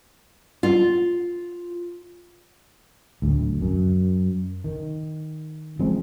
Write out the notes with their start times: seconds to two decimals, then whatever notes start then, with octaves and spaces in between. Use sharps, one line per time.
0.63 F4
3.22 D1 D2
3.61 F#2
4.64 D#3
5.79 F3 G#3 C4 C#4